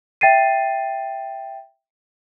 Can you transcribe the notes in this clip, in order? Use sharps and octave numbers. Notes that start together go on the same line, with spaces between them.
E5 G5 A6 C7 D#7